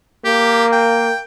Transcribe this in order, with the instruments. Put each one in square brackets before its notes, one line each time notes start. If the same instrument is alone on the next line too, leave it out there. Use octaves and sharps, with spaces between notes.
[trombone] A#3 [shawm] G4
[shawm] G5